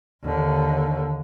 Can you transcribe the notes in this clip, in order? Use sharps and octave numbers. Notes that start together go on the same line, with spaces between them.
D#2 D3